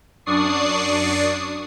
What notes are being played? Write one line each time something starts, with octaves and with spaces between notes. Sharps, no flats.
F#2 D4 D5 C#6 D#6 C7